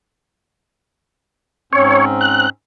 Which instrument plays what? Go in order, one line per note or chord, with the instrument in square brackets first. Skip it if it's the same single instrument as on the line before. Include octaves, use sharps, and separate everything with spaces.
[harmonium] G#2 C4 C#4 [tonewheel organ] C#5
[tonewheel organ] F#6